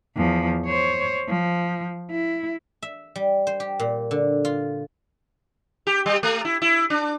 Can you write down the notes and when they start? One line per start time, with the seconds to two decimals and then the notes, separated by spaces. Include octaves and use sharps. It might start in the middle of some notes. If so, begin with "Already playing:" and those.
0.16 E2 F3
0.66 C5 C#5
1.29 F3
2.11 E4
2.82 E5
3.16 G3
3.47 C5
3.60 G4
3.80 A#2
4.11 D3
4.45 F4
5.87 G4
6.06 G3
6.23 A3
6.45 E4
6.62 E4
6.90 D4